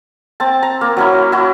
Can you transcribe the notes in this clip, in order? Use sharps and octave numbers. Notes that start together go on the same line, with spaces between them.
C4 A5
A#5
A#3
F#3 C#4 E4
E4 F#4